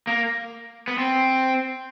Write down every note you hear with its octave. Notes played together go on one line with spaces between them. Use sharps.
A#3
B3
C4